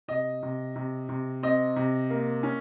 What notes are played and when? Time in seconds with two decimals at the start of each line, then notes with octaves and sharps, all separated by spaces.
0.08 C3 D#5
0.42 C3
0.76 C3
1.09 C3
1.43 C4 D#5
1.76 C3
2.10 A#3
2.43 C#4